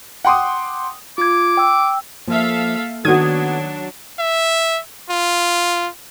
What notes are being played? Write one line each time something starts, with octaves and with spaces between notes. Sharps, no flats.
F#5 G5 C6 D6 D#6
F4 D6 G#6
G5 E6
F3 A#3 A4 E5 F5
D#3 F#3 A3 B3 D4 F#4 D#6 G#6
E5
F4